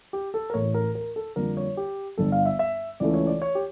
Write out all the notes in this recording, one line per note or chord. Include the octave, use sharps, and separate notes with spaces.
G4
A4
A#4
A1 A2 E3 A3 C#5
A#4
A#4
A4
F2 D3 G3 A#3 A#4
C#5
G4
G1 G2 D3 G3 A4
F5
E5
E5
C#2 C#3 E3 A3 D5
C#5
D5
C#5
G4